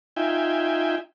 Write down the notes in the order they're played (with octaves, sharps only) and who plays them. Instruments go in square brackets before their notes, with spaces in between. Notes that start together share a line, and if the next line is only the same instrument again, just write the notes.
[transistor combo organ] D#4 F4 E5 G5 G#5